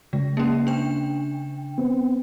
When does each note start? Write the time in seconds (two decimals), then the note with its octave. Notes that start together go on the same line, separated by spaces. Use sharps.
0.13 C#3 G#3
0.37 A#3 C#4
0.67 D4 G5
1.78 B3 C4